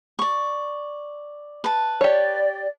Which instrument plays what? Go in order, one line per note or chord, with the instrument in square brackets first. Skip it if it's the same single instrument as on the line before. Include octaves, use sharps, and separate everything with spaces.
[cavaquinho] D5 C#6
B4 A5
[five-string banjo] G4 C#5 [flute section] D5